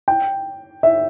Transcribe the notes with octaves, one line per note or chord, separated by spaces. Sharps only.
G5
E5